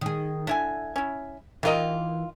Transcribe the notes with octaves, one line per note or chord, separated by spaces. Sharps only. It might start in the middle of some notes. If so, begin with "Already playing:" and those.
D#3 G#4
D3 E4 E5 G#5
C#4 E4
D#3 E3 F4 A#4 D#5